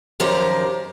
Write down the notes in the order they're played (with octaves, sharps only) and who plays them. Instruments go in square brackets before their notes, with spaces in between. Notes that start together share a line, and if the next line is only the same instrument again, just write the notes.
[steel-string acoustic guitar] F#2 D#3 F3 G4 A#4 C5